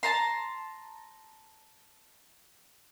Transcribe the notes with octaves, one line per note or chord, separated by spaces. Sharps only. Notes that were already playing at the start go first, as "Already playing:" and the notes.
A5 A#5 C6